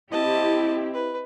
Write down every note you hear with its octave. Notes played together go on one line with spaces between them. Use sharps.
C4 E4 G4 D#5 A5
B4